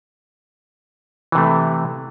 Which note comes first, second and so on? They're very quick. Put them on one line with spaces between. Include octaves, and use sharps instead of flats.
E3 C3 A3